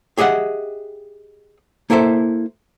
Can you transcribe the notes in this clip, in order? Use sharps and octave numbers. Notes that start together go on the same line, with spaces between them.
G4 G#4 D#5 E5 F#5
A#3 E4 A4 C5 E5